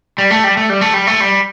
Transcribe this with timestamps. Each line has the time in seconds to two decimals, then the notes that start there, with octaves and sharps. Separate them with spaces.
0.18 G3
0.31 A3
0.44 G3
0.57 A3
0.70 G3
0.81 A3
0.94 G3
1.07 A3
1.20 G3